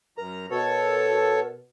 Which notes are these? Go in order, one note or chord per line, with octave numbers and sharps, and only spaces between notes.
F#2 A#4 A#5
B2 A4 C#5